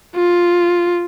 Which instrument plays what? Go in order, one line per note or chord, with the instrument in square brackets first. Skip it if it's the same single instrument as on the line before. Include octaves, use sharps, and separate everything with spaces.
[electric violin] F4